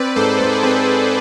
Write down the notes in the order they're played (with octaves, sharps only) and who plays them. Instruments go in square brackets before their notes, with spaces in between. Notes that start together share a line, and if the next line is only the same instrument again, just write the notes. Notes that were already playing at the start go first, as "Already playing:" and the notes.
Already playing: [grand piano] C4 [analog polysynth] B4 D5
[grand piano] G#2 [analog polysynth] A4 C5
[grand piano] G#2 [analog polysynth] A4 C5
[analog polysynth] G#4 B4
[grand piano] C4 [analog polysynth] G#4 B4